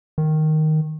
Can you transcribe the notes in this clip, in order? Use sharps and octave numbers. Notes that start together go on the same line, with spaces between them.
D#3